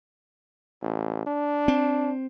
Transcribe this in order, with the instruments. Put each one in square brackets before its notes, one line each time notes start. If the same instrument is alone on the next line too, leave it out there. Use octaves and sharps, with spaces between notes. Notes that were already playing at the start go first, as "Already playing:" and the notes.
[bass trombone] A1
D4
[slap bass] C4